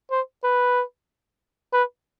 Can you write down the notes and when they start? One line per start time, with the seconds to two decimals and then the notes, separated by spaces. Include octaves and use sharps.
0.11 C5
0.44 B4
1.73 B4